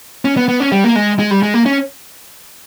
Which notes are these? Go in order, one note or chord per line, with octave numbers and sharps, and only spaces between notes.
C#4
B3
B3
C#4
G3
A#3
G#3
G#3
G3
G#3
A#3
C#4